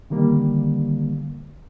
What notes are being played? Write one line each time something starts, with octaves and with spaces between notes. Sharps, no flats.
D3 D#3 G3 A#3